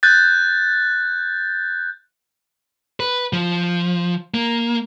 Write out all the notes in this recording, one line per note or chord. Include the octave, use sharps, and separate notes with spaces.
F#6 G6 A6
B4
F3
A#3